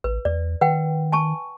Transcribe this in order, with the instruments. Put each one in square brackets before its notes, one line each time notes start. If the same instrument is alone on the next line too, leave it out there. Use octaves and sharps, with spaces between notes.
[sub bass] A1 [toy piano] B4
[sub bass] E2 [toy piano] D5
[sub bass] D#3 [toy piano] B4 F#5 G5
[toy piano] G#5 A5 C#6